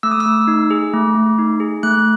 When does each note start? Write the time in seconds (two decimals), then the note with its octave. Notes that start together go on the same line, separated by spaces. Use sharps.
0.03 A3 E6
0.11 D#6
0.20 E6
0.26 A3
0.48 D#4
0.70 G#4
0.94 A3
1.15 A3
1.39 D#4
1.60 G#4
1.83 A3 F#6